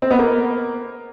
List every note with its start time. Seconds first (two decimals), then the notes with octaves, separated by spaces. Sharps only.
0.02 C4
0.11 B3
0.19 A#3